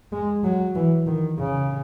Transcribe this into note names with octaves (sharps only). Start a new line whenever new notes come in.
G#3
F#3
E3
D#3
C#3